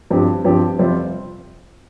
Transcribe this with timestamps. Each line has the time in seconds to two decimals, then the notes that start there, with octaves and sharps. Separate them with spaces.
0.10 G2 F3 C4 G4
0.45 G2 F3 C4 G4
0.79 F2 C3 G3 C4 F4